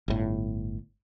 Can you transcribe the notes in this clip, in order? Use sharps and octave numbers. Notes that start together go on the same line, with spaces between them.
G1 A2